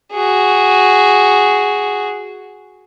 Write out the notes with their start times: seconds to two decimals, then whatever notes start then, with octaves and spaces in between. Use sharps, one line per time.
0.12 F#4 G#4